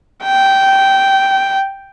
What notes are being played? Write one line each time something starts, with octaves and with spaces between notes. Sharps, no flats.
G5